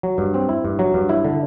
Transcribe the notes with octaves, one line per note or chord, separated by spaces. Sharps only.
F#3
G2
C4
E4
G2
F#3
G2
E4
D3